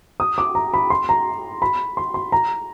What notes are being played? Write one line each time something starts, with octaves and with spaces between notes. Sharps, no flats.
D#6
D6
A#5
B5
C6
A#5
B5
C6
C6
A#5